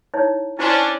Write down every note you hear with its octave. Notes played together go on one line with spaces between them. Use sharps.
D#4 E4 C#5
C#4 D4 E4 C5 C6